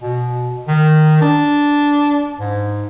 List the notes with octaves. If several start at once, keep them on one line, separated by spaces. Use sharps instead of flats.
B2
D#3
D4
G#2